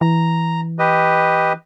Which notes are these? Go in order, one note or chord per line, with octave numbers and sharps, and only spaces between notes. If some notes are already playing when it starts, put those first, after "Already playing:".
E3 A#5
G4 B4 D#5